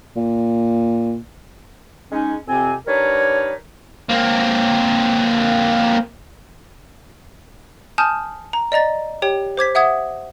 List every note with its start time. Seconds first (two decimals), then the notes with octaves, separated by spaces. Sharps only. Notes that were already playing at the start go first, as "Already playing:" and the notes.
0.16 A#2
2.12 G#3 C#4 D#4
2.47 F2 C3 C4 G#5
2.87 G3 D4 D#4 A#4 B4 C#5
4.09 A#3 C4
7.98 G#5 A5 D#6 F6 G6
8.53 A#5
8.72 D5 D#5 A#5 A6
9.22 G4 C#5 G5
9.57 C5 D6 G#6 B6
9.75 E5 F#5 D#6 G#6